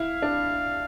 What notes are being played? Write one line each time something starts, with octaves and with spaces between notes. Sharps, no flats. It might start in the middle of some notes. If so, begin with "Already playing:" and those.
Already playing: E4 F5
D4